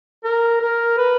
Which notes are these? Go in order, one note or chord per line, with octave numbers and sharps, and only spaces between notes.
A#4
A#4
B4